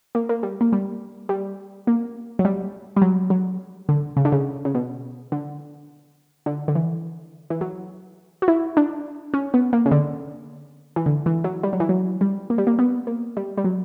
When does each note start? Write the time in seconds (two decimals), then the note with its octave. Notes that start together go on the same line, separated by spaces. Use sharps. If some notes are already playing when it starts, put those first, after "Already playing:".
0.15 A#3
0.29 A#3
0.43 G3
0.61 A#3
0.73 G3
1.29 G3
1.87 A#3
2.39 F#3
2.45 G3
2.97 G3
3.02 F#3
3.30 F#3
3.89 D3
4.17 C#3
4.25 D3
4.32 C#3
4.65 C#3
4.75 B2
5.32 D3
6.46 D3
6.68 D3
6.75 E3
7.50 E3
7.61 F#3
8.42 F#4
8.48 E4
8.77 D4
9.34 C#4
9.54 B3
9.73 A#3
9.86 C#3
9.92 D3
10.96 E3
11.06 D3
11.26 E3
11.44 F#3
11.63 G3
11.73 F#3
11.80 E3
11.89 F#3
12.21 G3
12.50 A#3
12.58 G3
12.67 A#3
12.79 B3
13.07 A#3
13.37 G3
13.58 G3
13.64 F#3